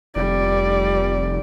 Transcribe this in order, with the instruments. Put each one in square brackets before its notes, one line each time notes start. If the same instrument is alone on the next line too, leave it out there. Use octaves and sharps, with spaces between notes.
[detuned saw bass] F1 [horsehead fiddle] G3 D5